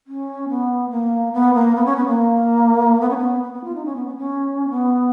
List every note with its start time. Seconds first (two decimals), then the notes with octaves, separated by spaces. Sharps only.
0.07 C#4
0.49 B3
0.91 A#3
1.33 B3
1.54 A#3
1.75 B3
1.85 C#4
1.96 B3
2.07 A#3
3.01 B3
3.10 C#4
3.18 B3
3.44 B3
3.54 B3
3.64 F4
3.75 D#4
3.85 C#4
3.96 B3
4.07 B3
4.17 C#4
4.70 B3